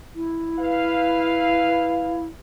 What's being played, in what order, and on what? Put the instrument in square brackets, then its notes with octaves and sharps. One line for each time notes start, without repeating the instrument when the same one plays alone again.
[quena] E4
[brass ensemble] B4 F5